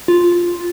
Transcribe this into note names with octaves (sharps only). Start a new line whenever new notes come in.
F4